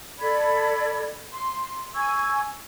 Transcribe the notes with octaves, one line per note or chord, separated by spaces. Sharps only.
A4 D5 B5 G#6
C6
G#5 C#6 E6 G#6